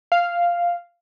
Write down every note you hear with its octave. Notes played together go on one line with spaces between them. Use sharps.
F5